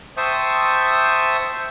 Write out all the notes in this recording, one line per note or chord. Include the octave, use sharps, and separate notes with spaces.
C5 E5 G5 A5 C#6 D#6